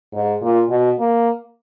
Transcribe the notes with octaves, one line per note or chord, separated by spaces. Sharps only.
G#2
A#2
B2
A#3